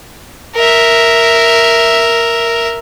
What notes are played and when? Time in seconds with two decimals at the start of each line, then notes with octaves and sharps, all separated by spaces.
0.55 A#4 E5